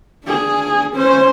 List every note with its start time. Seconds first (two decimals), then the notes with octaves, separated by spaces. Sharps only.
0.24 D4 G#4
0.94 C#4 C5